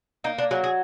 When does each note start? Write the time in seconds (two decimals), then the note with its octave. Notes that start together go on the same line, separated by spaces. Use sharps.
0.24 A#3 D#4
0.38 D4
0.51 F#3 G#4
0.64 G#4